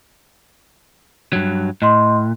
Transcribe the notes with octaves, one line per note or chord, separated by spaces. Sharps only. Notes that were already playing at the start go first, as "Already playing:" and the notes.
G2 F#3
A2 D#5 C6